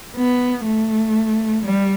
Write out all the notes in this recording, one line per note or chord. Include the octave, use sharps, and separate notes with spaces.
B3
A3
G3